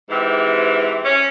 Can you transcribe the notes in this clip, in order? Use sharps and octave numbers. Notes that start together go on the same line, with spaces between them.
G#2 C3 E3
C#4